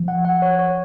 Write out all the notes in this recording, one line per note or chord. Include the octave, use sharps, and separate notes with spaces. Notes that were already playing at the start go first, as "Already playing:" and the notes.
Already playing: F3
F#5
F#5
C#5
C#5